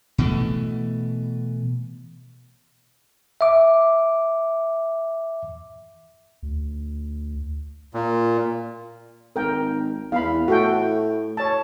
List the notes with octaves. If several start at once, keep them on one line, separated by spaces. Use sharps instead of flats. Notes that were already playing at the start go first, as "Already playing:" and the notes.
B2 E3 A3
E5 D6
D2
A#2
G#1 A#4 G5
E2 F5 B5
A2 F#4 A4 G5
C#5 A5